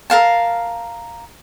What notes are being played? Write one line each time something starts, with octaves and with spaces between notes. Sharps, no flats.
A#4 F5 A5